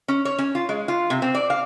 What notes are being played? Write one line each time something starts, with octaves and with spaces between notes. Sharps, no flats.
C#4
C#5
C#4
F4
G#3
F4
C3
C4
D5
F5